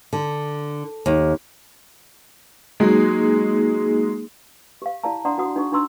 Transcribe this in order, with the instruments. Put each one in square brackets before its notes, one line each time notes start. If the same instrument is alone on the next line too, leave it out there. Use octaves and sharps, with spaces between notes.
[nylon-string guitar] D3
D#2
[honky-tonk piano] F#3 G#3 [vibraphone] A#3 D#4 G#4
[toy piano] G4 F5
E4 G4 D5 F5 A5 A#5
D4 D5 F#5 A#5 C6 D#6
F#4 F#5 D#6
D4 D#4 F#4 G#4 C#6
D4 D#4 A#5 C6 E6